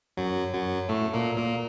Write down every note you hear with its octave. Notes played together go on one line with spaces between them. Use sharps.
F#2 F#3
F#2 F#3
A2 A3
A#2 A#3
A#2 A#3